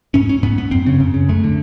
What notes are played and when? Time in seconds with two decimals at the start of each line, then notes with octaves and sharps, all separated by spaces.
0.14 G#2 C#4
0.29 C#4
0.43 G#2 B3
0.58 B3
0.71 F#2 C4
0.86 C#3
1.00 F#2
1.14 C#3
1.29 F#2 A3
1.44 D3